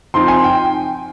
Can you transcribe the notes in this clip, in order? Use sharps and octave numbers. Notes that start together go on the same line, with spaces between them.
F3 C4 D#4 C6
G#5
G5